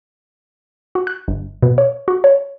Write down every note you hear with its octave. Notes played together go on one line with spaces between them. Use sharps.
F#4
F#6
G1
B2
C#5
F#4
C#5